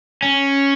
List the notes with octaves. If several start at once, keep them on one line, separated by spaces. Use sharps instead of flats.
C#4